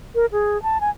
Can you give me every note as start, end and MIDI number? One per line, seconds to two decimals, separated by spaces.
0.15 0.26 70
0.32 0.61 68
0.63 0.80 81
0.81 0.90 80